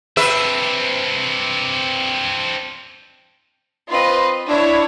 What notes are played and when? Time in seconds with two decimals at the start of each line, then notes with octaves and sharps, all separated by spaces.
0.17 C4 D4 B4 E5
3.89 C4 F4 B4 D#5
4.48 D4 E4 C#5